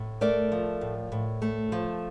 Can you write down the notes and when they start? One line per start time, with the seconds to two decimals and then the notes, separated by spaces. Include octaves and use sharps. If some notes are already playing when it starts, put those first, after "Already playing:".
Already playing: A2
0.21 A3 A#4 D5
0.52 F3
0.81 A2
1.12 A2
1.42 A3
1.72 F3